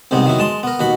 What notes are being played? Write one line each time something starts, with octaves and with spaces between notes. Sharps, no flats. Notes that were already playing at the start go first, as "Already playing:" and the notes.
C2 G#2 C3 B3 C4
D#3 F#3 B3 E4
G#3 A5 C6
B3 A#4
D#2 B2 F#4 B5